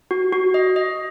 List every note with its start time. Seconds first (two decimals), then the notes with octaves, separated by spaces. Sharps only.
0.11 F#4
0.33 F#4
0.54 D#5
0.76 D#5